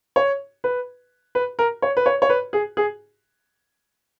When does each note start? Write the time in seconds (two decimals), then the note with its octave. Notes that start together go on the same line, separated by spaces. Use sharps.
0.16 C#5
0.64 B4
1.35 B4
1.59 A#4
1.82 C#5
1.97 B4
2.06 C#5
2.22 C#5
2.30 B4
2.53 G#4
2.77 G#4